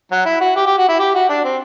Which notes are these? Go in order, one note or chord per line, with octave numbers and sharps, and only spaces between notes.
F#3
E4
F#4
G4
G4
F#4
E4
G4
F#4
D4
C4